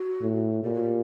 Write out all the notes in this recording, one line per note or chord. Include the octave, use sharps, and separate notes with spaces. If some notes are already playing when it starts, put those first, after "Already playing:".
Already playing: F#4
A2
A#2 G4
F#4
G4